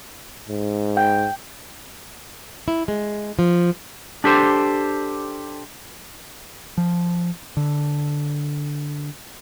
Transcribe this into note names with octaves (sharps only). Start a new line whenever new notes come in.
G#2
G5
E4
G#3
F3
D4 G4 A4 C5
F3
D3